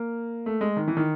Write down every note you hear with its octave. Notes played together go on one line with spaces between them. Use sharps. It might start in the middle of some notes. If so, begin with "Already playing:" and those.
Already playing: A#3
A3
G#3
D#3
E3
D#3